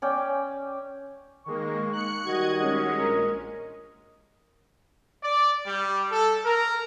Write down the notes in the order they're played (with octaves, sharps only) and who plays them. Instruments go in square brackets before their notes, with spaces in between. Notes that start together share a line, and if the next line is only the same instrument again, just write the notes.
[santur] C#4 D5 G5
[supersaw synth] D#3 G#3 A#3 [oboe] C#6
[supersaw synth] F#6 C#7
[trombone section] D#3 G3 F#4 [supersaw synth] D#5 G#6
[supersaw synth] G#3 C#4 [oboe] D#5
[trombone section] A#1 A#4
[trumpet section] D5
G3
A4
A#4